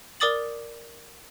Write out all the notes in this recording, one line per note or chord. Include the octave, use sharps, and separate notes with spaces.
A#4 D5 D6 D#6 A6 F#7